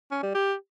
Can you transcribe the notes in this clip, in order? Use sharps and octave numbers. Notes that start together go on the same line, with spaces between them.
C#4
G3
G4